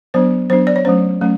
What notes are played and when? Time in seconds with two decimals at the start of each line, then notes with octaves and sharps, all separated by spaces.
0.14 F#3 B3 D4 C5
0.50 F#3 B3 D4 C5
0.67 D5
0.76 C#5
0.85 F#3 A3 C#4 C5
1.21 F#3 A3 C#4